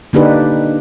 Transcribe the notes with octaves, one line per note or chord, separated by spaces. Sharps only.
D3 A#3 D4 D#4 G4 B4